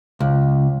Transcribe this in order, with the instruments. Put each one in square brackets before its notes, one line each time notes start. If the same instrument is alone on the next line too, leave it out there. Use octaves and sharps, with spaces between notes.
[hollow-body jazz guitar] C#2